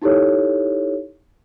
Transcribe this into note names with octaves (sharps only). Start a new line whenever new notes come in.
D#4 E4 G4 A4 C#5